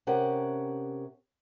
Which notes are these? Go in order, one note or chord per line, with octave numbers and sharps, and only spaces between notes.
C3 C#4 G4 A#4 F#5 A5